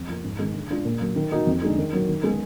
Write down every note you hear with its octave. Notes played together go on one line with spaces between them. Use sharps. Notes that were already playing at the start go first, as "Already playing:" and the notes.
Already playing: F2
F3 A#3
G#2
D#3 G#3
D3
G#3 D4 F4
A#2
F#3 A#3
D#3
A#3 D#4 F#4
F2
D3 G#3 D#4
D#3
F#3 A#3
D#3
G#3 B3